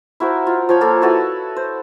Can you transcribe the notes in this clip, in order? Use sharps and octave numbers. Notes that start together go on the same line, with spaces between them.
E4 F#4 A#4 C5
F4
F3 C#5 B5
A#3 A4
E4 F#4 A4 B4
C5